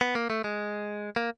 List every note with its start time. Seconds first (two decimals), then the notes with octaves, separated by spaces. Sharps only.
0.01 B3
0.15 A#3
0.30 A3
0.44 G#3
1.16 A#3